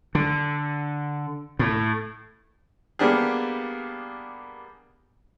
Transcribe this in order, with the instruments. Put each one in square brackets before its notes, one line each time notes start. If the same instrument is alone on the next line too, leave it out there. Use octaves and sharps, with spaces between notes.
[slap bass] D3
A2
[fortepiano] G3 A#3 B3 D4 G4 G#4